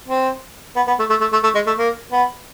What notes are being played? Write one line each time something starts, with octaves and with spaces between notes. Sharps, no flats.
C4
B3
B3
A3
A3
A3
A3
A3
G#3
A3
A#3
B3